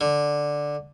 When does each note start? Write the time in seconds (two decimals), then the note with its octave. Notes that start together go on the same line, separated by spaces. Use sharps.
0.01 D3